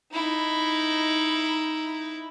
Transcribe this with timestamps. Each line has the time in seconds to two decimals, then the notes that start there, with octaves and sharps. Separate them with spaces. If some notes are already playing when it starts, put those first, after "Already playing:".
0.13 D#4 E4